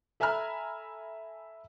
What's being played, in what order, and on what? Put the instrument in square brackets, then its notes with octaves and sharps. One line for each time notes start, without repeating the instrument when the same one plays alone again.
[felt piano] A4 E5 G#5 A#5 B5 F6